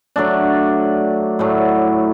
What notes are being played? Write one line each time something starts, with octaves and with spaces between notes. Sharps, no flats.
F#3 A3 D4
A2 F#3 A3